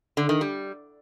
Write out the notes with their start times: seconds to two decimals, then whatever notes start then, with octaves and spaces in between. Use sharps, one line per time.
0.17 D3
0.29 D#3
0.41 G3